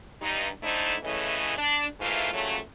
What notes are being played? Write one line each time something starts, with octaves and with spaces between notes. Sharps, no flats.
G2 D#4
D3 A3 D#4 E4 C5
A2 C#3 E3 A3 D#5
D4
G#2 E3 A3 A#3 F4
A#2 C#3 F#3 A3